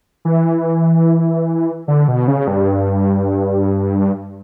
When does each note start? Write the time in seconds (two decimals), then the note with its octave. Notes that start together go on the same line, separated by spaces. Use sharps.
0.25 E3
1.88 D3
2.08 B2
2.28 C#3
2.48 G2